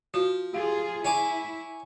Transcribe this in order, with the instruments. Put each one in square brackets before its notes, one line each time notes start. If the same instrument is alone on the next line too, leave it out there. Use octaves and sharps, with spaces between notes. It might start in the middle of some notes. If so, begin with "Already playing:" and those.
[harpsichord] F3 [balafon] F#4
[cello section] F4 G#4 [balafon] G4 F5
[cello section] E4 [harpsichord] C#5 G#5 D6